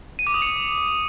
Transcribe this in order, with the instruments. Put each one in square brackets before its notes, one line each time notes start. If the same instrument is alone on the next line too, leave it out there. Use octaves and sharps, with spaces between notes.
[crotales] D#7
D6
D#6
C#7